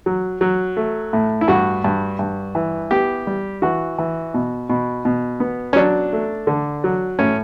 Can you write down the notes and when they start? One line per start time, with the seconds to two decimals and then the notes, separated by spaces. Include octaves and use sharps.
0.06 F#3
0.41 F#3
0.77 A3
1.13 A2
1.41 E4
1.48 G2 F#4
1.84 G2
2.19 G2
2.55 E3
2.91 B3 G4
3.27 G3
3.62 E3 F#4
3.98 E3
4.34 B2
4.70 B2
5.05 B2
5.40 B3
5.73 C#4
5.76 F#3 D4
6.13 A3
6.47 D3
6.84 F#3
7.19 A2 C#4